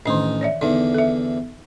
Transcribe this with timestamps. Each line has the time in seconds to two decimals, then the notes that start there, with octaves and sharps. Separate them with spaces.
0.06 A1 D#3 D4 D#4
0.41 C#5 D5 E5
0.61 E2 D3 D#4
0.94 A4 E5